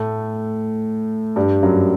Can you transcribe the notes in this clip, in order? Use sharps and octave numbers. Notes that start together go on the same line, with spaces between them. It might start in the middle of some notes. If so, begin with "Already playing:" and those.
Already playing: A2 A3
G2 G3
F#2 F#3